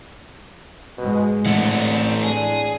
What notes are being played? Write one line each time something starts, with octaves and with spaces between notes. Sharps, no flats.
G#2 B2 G#3
A2 D3 E3 A3 C4 F#5
D4 G#4